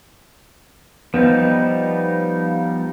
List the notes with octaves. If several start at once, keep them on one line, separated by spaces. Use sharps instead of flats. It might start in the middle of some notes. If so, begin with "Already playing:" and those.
F3 G3 B3 D#4